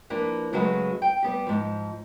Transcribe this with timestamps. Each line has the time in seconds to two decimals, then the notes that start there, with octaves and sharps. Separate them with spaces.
0.10 F3 A#3 D4 E4 B4
0.53 C#3 F#3 G#3 A3 F#4 B4
1.02 G5
1.23 G3 B3 G4
1.47 G#2 F3